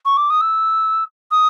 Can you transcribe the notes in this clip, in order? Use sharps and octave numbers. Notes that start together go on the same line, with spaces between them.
C#6
D6
D#6
E6
D#6